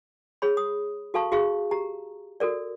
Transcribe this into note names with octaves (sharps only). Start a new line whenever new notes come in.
G#4 C#5 B5
D#6
F#4 A4 F5 A5 C#6
F#4 G#4 F5 C#6
G4 A#5
F#4 A4 A#4 D5